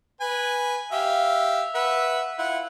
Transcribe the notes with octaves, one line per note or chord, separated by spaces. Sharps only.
B4 G#5
G4 E5 F5
B4 E5 F#5
E4 F4 F#5